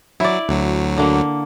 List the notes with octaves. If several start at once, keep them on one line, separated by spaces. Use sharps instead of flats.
F#3 E4 D5
D2 F#3
D3 A#3